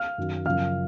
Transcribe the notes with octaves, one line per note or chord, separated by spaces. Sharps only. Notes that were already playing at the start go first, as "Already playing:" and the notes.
Already playing: F5 F6
F#2 D#3 F#3
F#2 C#3 F3 F5 F6